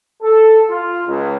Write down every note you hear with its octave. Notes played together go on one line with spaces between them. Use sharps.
A4
F4
C#2